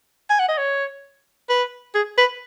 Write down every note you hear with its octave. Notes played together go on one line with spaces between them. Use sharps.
G#5
F#5
D#5
C#5
B4
G#4
B4